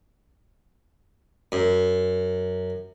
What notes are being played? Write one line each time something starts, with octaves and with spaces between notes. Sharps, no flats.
F#2